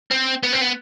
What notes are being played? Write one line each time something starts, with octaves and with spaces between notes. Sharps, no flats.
C4
B3
C4
B3